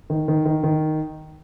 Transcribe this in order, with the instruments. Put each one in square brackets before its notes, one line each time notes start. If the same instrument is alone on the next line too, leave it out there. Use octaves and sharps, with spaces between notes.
[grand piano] D#3
D#3
D#3
D#3